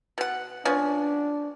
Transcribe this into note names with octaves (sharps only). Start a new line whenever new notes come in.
B2 F#5
F3 B3 C#4 D4